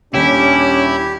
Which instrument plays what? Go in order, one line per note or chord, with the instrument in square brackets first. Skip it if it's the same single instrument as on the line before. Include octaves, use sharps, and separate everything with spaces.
[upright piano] D#1 [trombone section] C#4 D4 [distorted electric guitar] E4 [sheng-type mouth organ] G4